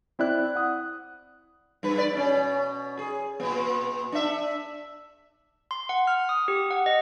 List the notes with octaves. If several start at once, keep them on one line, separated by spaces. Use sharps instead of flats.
C4 E4 D5 F#6
F#5 D#6
G2 B4
B4 D5
B2 C#4
G#4
A#2 B3
D4 E5
C6
F#5
F6
D#6
G4
F#5
D#5